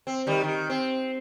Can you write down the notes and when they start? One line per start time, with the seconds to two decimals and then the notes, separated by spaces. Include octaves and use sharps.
0.07 C4
0.27 D#3 G3
0.43 D#3
0.70 C4